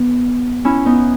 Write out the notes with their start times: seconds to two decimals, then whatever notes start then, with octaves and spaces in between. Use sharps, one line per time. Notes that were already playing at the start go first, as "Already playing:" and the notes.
Already playing: B3
0.65 C#4 E4
0.86 B3 D#4